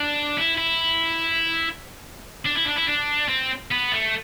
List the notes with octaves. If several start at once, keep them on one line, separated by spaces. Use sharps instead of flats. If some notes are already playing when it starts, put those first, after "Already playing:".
Already playing: D4
E4
E4
D4
E4
D4
E4
D4
C4
B3
A3